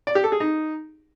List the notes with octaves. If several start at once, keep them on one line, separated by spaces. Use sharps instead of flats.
D5
G4
A4
G#4
D#4